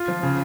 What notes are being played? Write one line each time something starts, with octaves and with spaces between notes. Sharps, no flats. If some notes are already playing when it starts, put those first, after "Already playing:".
Already playing: F4
F3
C#3